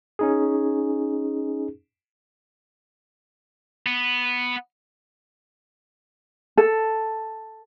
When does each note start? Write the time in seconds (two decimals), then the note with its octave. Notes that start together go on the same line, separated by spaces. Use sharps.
0.19 C#4 D#4 G#4
3.86 B3
6.57 A4